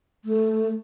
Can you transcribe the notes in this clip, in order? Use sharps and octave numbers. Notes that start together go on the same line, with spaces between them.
A3